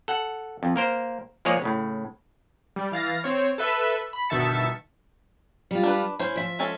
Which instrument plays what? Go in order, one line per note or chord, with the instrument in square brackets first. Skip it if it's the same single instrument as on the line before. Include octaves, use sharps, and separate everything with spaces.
[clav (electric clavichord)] A4 F#5
F2
A#3 A#4 C5
F3 G#3 A#3 G#4 C#5 D5
A2 C#3
[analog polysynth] G3
E3 F5 A6 A#6
C4 C#5
A4 B4 E5
B5
G1 B2 D#3 E5 A5 C#7
[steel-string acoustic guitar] G3 F4
[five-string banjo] D4 B4
[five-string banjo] C#4 C5 [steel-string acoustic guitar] E4
[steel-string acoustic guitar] F3 E5
[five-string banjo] G#3 C#4 A4